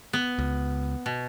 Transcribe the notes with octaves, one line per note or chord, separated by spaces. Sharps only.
B3
C#2
B2